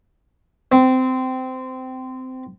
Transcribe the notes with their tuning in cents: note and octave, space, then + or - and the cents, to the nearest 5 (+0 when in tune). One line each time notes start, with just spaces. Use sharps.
C4 -20